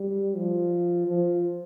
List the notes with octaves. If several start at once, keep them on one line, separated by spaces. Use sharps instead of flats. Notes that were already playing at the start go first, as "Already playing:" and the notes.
Already playing: G3
F3
F3